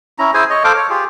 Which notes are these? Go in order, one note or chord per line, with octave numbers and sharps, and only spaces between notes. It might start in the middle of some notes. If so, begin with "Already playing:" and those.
C#4 E4 A#5
E4 G#4 C5 G#5
C#5 D#5
A4 C5 F5 D6
C#5
F4 G4 G#4